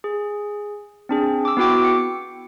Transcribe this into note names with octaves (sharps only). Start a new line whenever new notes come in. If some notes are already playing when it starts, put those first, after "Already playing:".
G#4
C4 D4 G#4
D6 E6
B3 E4 F#4 G5 D6
C#7